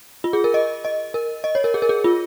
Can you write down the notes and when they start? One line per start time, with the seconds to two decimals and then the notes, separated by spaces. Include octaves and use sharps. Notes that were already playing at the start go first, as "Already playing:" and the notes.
0.24 F4
0.33 G#4
0.44 A#4
0.54 D#5
0.85 D#5
1.14 A#4
1.44 D#5
1.55 C#5
1.64 A#4
1.74 G#4
1.82 A#4
1.89 G#4
2.04 F4